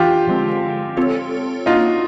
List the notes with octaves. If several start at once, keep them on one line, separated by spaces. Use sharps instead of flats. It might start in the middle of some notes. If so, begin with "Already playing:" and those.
Already playing: E3 A3 D4 F4 G4
D3 F3 G#3 C4
C4 F4 A4 C#5
A#3 D4 D#4 F4 F#4